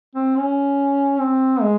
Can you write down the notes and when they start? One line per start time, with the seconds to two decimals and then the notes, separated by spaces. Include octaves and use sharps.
0.15 C4
0.36 C#4
1.20 C4
1.61 G#3